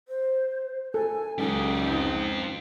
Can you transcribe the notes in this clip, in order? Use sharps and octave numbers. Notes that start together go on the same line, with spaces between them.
C5
A4 G#5
C#2 F#3 D#4 G4
C4 F4